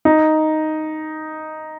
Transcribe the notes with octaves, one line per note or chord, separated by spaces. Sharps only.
D#4